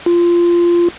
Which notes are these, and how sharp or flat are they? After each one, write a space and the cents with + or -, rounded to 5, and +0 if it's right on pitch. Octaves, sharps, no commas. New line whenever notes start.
F4 -15